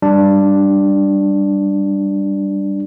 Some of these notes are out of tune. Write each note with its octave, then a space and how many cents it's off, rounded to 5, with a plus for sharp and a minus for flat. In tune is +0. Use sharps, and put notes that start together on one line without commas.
G3 +0 D4 +0